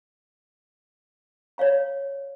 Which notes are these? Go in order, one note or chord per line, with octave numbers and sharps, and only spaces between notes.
C#5 D5 F5 A#5